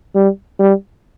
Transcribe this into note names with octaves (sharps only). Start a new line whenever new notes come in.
G3
G3